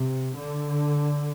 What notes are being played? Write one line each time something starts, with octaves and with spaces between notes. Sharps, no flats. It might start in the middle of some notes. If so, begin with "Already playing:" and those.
Already playing: C3
D3